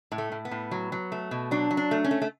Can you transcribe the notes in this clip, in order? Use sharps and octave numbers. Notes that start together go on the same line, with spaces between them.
A2
A3
A2
B3
A2
F#3
F#3
A3
B2
F#3 D4
F#3
D4
A3
C#4
A3
A3